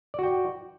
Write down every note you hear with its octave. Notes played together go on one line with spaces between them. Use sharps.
F#4 D5 G5